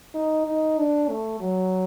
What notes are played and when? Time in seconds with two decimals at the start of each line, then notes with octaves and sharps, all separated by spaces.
0.14 D#4
0.46 D#4
0.78 D4
1.09 A3
1.40 F#3